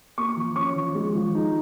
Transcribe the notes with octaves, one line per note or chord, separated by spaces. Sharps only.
A#3 C#6
F3
C#4 C#6
F3
G#3
F3
D#4